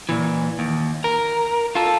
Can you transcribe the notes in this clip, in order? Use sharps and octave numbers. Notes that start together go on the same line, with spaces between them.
A#2 E3
D#2
A#4
F4 A4